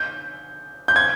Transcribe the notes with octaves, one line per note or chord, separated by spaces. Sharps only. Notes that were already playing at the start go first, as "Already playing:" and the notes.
Already playing: G6
G6
G#6